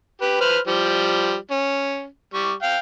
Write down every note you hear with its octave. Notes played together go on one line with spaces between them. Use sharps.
G4 B4
B4 C5 F6
F3 G3
C#4
G3 C#6
F5 G5